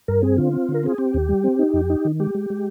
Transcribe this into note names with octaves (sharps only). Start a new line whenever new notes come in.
G2 A#4
C4 G#4
D3 F4
C4
D3
A#4
C4 G#4
C4 G4
D#2
G3
C4
D#4
F2
D#4
D#3
G#3 G4
G#3
G#3